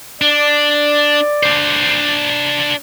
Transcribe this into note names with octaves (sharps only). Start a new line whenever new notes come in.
D4 D5
D4 C5